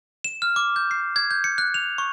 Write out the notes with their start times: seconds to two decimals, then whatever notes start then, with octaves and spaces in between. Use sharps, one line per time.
0.24 E7
0.42 F6
0.56 D6
0.76 G6
0.91 C7
1.16 G#6
1.31 G6
1.44 C#7
1.58 F#6
1.74 F7
1.98 C#6